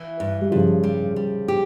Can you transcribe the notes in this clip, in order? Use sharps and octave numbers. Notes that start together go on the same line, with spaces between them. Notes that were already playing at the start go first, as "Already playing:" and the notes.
Already playing: E3
G2
G3
G2 C#3 F3
G3
G3
G4